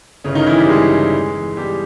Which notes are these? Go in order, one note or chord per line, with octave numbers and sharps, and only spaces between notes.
G1 C#3 C#4
D#3 D#4
G1 E3 E4
G3 G4
G2 G#3 G#4
E3
E2
E2
B2 G3 G4